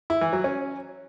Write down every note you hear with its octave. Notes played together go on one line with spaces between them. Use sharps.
E4
E3
F#3
C#4